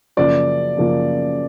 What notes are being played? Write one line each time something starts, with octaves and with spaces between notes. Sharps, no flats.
F#2 C#3 F3 A#3 D5
F#2 C#3 F3 A#3